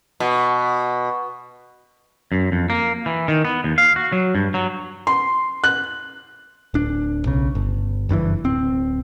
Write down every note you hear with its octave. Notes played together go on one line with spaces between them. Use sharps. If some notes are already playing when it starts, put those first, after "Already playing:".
B2
F#2
F2
A#3
E3
D#3
B3
D#2
F5
F#4
F#3
G2
F#3
C6
F#6
D1 D4
B1 C#3
G1
F#1 G2 D3 E3
D1 C4